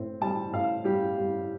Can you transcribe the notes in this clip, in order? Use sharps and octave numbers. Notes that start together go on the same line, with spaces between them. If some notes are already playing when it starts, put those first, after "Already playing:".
Already playing: A2 C4
G3 A5
A2 F5
G3 G4
G3